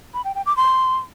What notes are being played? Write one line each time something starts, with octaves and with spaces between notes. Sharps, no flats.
B5
G5
G5
D6
C6